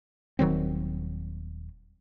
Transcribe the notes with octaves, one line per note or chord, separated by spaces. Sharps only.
D#1 D#3 F#3 C4